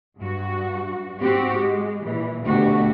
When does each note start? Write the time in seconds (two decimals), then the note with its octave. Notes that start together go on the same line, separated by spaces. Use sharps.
0.17 G2 F#4
1.21 G#2 C4 F#4 G4
1.56 G#3
2.02 A#2 E3
2.43 D2 B2 A3 F#4 G4